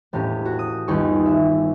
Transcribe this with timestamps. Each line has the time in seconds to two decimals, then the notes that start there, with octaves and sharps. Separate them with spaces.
0.13 E1 A2 C#4 G4
0.45 F#4
0.59 D#6
0.88 G1 D#2 D#4 G#4 C#6
1.25 E5